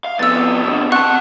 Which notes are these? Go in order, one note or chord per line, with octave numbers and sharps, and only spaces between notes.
F5
F2 B3 E6 A6
B2 D3
C4 F#5 A5 C#6 F#6